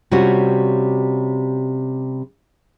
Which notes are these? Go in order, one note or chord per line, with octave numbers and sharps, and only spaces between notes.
C3 G3 C#4 F4 F#4